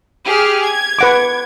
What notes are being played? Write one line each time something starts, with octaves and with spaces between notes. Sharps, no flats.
G4 G#4 F6
G#6
B4 F#5 D6